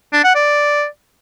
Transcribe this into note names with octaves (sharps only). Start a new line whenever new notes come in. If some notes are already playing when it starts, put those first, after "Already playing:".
D4
F#5
D5